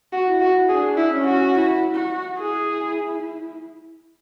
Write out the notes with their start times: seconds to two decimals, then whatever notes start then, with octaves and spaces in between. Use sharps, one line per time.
0.13 F#4
0.27 E4
0.41 F#4
0.69 D4 G#4
0.97 E4
1.11 C#4
1.25 F#4
1.54 E4
1.95 F#4
2.38 E4 G#4